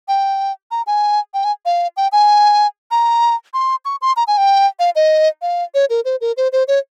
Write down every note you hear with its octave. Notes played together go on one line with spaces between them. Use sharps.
G5
A#5
G#5
G5
G#5
F5
G5
G#5
A#5
C6
C#6
C6
A#5
G#5
G5
F5
D#5
F5
C#5
A#4
C5
A#4
C5
C5
C#5